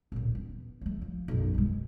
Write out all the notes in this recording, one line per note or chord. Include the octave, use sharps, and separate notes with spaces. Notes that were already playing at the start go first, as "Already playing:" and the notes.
D1 A#2
B3
F3 A3
F3
B1 F#2
B2 G#3